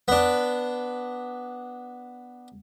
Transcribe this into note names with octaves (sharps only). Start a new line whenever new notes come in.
B3 D4